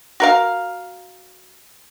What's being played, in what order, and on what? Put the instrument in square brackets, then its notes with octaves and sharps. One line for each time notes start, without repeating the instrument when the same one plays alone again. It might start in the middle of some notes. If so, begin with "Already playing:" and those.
[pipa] F#4 A#4 F5